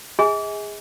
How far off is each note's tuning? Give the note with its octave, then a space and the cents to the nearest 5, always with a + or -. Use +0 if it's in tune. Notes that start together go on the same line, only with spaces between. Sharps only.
G#4 -15 D#5 +45 G#5 +0